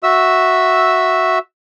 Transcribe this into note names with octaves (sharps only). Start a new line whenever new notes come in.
F#4 E5 E6